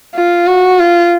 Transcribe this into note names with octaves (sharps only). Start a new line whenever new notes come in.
F4
F#4
F4